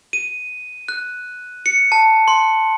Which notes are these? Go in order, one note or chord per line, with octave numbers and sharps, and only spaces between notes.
D#7
F#6
C#7
A5
C6